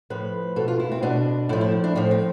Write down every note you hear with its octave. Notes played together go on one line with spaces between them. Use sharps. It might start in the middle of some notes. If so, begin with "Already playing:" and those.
A2 F3 B4
B2 A4
F4
E4
C4
B2 D4
A2 F3 E4
E4
D4
A2 F3 C4
C4